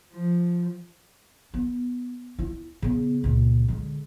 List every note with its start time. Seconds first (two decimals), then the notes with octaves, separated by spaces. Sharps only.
0.12 F3
1.54 B3
2.39 E4
2.82 C#3 B3
3.24 C#2 A#2
3.68 D3 G#3